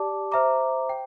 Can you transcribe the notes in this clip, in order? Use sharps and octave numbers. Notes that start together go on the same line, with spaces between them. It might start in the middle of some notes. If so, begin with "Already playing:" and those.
Already playing: G4 D5 A5 D6
C5 E5 A#5 D6
G5